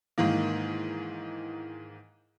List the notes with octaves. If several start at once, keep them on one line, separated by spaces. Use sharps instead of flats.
G#2 D#3 E3 A#3